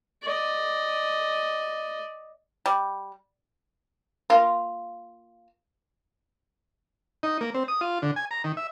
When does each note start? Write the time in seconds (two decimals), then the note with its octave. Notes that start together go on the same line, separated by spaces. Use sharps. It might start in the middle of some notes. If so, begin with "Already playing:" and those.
0.23 D5 D#5
2.66 G3
4.30 A#3 F4
7.23 D#4
7.41 A#3
7.54 C4
7.68 D#6
7.81 F4
8.02 D3
8.16 G#5
8.31 A#5
8.44 D#3
8.57 E5